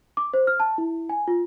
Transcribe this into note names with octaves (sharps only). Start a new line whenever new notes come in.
D6
C5
F6
A5
E4
G#5
F4